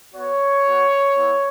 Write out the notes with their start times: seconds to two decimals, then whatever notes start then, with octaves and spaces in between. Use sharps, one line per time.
0.14 B3 F#4 C#5
0.66 B3 F#4
1.16 B3 E4